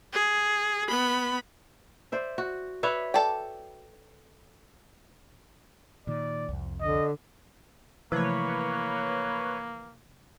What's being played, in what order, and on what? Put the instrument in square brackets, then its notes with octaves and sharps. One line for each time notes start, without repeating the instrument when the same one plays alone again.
[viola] G#4
B3 B5
[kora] C5 D5 E5
F#4
[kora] B4 C#5 E5 [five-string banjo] D5
[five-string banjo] A4 D5 G5
[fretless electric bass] A#2 D#3 [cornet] D5
[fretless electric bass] C2 F2
[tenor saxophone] D3 [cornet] D#5
[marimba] C3 F3 A3 [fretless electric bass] E3 [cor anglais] A#3 [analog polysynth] B4 C#5